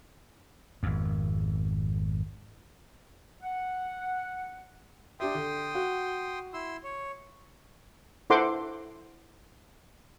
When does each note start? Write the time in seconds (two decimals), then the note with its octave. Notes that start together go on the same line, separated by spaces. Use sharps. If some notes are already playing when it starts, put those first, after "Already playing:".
0.83 G#1 F2
3.43 F#5
5.20 D4 G4 E5 G5 C6 D#6
5.35 D3
5.75 F#4
6.54 E4 C6 E6
6.84 C#5
8.30 E4 A4 C5 F#5 C6 D6